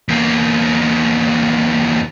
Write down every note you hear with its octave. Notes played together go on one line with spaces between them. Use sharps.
E2 A#3